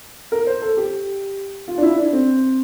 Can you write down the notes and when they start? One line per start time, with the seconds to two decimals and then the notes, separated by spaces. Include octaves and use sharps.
0.32 A#4
0.47 C5
0.62 A4
0.77 G4
1.68 F4
1.78 D4
1.83 E4
1.98 D4
2.13 C4